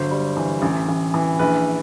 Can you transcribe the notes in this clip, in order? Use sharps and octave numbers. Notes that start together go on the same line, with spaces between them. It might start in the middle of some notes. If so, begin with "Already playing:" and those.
Already playing: G1 F#3 C5
G3
E3
A1
A1
E3
A#1 B4